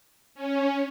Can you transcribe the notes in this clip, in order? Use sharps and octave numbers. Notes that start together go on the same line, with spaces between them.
C#4